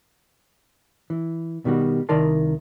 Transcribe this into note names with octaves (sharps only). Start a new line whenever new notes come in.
E3
B2 D#3 G3 F#4
C2 D#3 A#4 D5 A5 C6